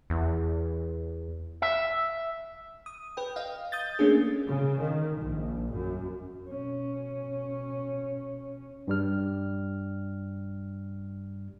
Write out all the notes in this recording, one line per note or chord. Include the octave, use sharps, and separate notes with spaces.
E2
E5
D#6
B4 G5
D#5 F5
D#6 G6 A6
A3 A#3 C#4 D4 G#4
C#3
D#3
A#1
F#2
B2 C#4
G2 G3 F6